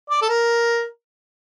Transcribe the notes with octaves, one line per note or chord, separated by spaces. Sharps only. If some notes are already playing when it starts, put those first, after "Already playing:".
D5
A4
A#4